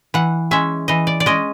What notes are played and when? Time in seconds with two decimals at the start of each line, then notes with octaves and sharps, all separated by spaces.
0.14 E3 F#5
0.51 G#3 C#4 E5
0.88 E3 D#5
1.07 D5
1.20 D5
1.26 G#3 C#4 D#5